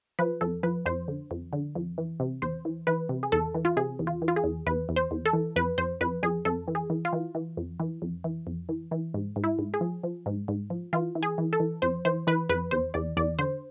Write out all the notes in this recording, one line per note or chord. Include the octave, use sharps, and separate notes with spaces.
F3 B4
F2 A4
F3 B4
F2 C5
D3
F2
D3
F2
E3
C3
E2 C5
E3
E3 B4
C3
G#4
E2 A4
E3
F4
C3 G#4
E2
F4
E3
F4
G#4
E2
E2 B4
E2
C5
E2
A4
E3
F2 B4
F2 C5
F2 B4
F2 G#4
F2 A4
E3
G#4
E3
F4
E3
E3
F2
E3
F2
E3
F2
E3
E3
G#2
G#2
E4
G#2
G#4
F3
F3
G#2
G#2
F3
E3 F4
E3
G#4
E3
A4
E3
F2 C5
E3 C5
E3 B4
F2 B4
E2 C5
E2 D5
E2 D5
D3 C5